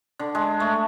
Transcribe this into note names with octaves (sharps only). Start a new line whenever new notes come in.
D3
G#3
A3